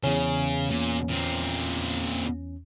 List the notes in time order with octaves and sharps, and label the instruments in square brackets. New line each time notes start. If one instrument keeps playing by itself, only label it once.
[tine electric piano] E2 C#4 [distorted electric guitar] C#3
[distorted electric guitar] A#2
A#2 C4